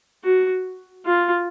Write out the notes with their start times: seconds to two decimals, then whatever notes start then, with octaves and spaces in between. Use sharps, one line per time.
0.24 F#4
1.06 F4